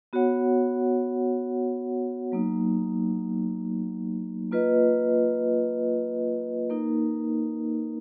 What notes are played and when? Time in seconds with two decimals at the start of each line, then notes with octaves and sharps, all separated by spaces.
0.13 B3 F#4 C#5 F#5
2.32 F#3 A#3 D#4
4.51 A#3 F4 B4 D#5
6.70 A#3 D#4 A#4